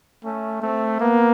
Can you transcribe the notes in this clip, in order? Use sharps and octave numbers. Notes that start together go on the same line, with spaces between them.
A3 C#4
A3 C4
A#3 B3